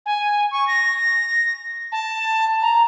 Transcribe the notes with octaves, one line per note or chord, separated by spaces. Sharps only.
G#5
C#6
A#6
A5
A#5